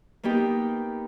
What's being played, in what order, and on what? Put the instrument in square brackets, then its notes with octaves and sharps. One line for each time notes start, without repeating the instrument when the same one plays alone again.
[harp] A#3 B3 D#4 G4